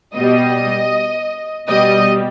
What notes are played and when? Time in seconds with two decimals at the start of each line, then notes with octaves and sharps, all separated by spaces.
0.16 B2 G3 D#5
1.68 B2 G3 D#5